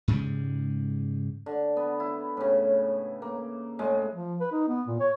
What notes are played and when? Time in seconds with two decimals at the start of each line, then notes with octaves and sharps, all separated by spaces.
0.08 G#2 C#3 G3 G#3
1.46 D3
1.77 B3
2.00 E4
2.37 A2 C#3
3.22 A#3
3.79 A2 G#3
4.13 F3
4.40 B4
4.52 D#4
4.68 B3
4.87 A#2
5.00 C#5